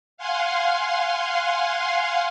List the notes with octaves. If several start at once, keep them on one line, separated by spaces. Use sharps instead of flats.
F5 F#5 G#5 C6